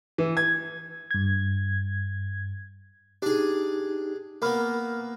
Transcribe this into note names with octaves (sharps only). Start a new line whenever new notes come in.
E3
G#6
G2 G#6
D4 D#4 G4 G#4
A#3 B3 A#4 B5 F6